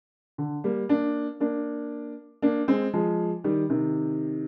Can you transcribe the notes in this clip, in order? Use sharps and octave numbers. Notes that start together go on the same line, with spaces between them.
D3
G3 A#3
A#3 D4
A#3 D4
A#3 D4
G#3 C4
F3 G#3
D#3 G3
C3 D#3